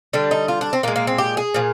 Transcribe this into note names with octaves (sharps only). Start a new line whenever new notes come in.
D3 G3 D4
D#4
F4
D4
C4
A#2 G#3 A#3
A#3
C4
G4
G#4
A#2 F3